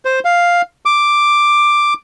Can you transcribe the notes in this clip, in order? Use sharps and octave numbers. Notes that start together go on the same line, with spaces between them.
C5
F5
D6